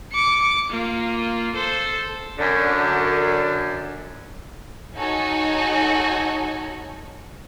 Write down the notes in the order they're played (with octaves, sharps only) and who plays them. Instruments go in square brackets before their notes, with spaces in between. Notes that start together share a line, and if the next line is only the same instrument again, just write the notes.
[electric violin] D6 C#7
A#3 F4
A4 C5
[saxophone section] F#2 D3
[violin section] D#4 F#4 G#4 A4 C#5 G#5